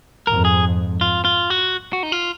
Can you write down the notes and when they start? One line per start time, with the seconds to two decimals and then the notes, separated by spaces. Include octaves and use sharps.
0.27 F2 G#2 A#4
0.45 G#4
1.01 F4
1.25 F4
1.50 F#4
1.93 F#4
2.03 D#4
2.12 F4